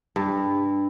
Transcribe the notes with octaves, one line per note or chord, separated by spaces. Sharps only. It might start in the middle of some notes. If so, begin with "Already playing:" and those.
G2